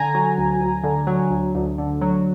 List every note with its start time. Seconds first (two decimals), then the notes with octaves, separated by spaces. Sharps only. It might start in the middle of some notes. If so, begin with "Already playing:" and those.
Already playing: D3 G#5 A#5
0.15 F#3
0.38 D2
0.61 D2
0.84 D3
1.07 F#3
1.31 D2
1.55 D2
1.78 D3
2.01 F#3